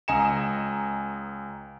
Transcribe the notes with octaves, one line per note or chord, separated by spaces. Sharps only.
C#2 D#5 G#5 A#5 C#7 E7